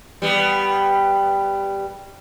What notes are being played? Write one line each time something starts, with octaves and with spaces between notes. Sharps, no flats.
G3 B3